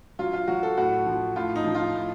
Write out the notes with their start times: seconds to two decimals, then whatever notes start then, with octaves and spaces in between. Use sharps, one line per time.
0.19 F#3 F4
0.33 F4
0.48 F#3 F#4
0.63 A4
0.77 A2 F#4
1.06 F3
1.36 A2 F4
1.55 D#4
1.65 F3
1.75 F4
1.94 A2